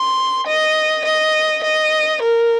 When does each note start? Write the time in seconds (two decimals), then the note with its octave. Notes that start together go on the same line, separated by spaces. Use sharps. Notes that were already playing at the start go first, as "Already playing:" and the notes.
Already playing: C6
0.46 D#5
1.05 D#5
1.64 D#5
2.22 A#4